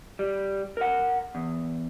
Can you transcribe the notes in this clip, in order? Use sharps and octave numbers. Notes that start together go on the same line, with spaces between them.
G3
A#4 F#5
E2